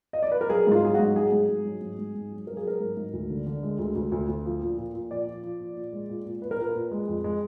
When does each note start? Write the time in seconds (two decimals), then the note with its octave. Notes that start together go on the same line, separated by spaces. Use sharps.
0.13 D#5
0.23 D5
0.32 B4
0.41 A#4
0.50 F#3 G#4
0.67 G#2 F4
0.83 F#3 G#4
0.94 F#4
0.99 G#2
1.16 F#3 G#4
1.32 G#2
1.49 G#2
1.65 F#3
1.81 G#2
1.99 G#2
2.15 G#2
2.31 F#3
2.47 F#3 A#4
2.57 G#4
2.64 F#3 A#4
2.80 G#2
2.97 G#2
3.13 D2
3.30 D3
3.46 D3
3.63 G#3
3.79 D2
3.96 D2
4.12 D2
4.28 D2
4.45 F3
4.61 A#2
4.78 A#2
4.94 A#2
5.10 F3 D5
5.27 F3
5.43 F3
5.60 A#2
5.76 A#2
5.93 G#3
6.10 A#2
6.26 A#2
6.42 A#2 B4
6.51 A#4
6.58 A#2 B4
6.75 A#2
6.91 G#3
7.08 F2
7.24 G#3